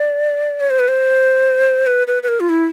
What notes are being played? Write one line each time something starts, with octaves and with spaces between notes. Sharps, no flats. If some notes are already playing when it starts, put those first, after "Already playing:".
Already playing: D5
C#5
C5
B4
C5
B4
B4
B4
A#4
F4
E4